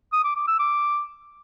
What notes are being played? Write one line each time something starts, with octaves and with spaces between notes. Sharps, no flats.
D#6
D6
D6
E6
D6